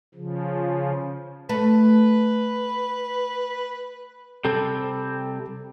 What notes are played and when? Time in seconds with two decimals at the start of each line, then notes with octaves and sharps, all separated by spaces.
0.15 C#3 F3
1.49 A3 B4
4.45 C3 G3 C4 A4